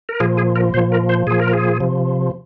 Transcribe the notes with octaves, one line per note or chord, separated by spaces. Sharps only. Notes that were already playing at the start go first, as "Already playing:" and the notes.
A#4
A#2 F3 G#4
G#4
A#4
A#2 F3 C5
A#4
C5
A#2 F3 G#4
A#4
G#4
C3 F3